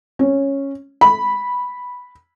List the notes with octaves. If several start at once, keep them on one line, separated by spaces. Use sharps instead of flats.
C#4
B5